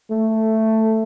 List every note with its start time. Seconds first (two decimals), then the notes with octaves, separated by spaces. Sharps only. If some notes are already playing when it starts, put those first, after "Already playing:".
0.10 A3